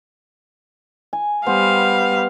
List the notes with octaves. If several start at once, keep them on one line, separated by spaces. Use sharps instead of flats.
G#5
G3 B3 C5 F5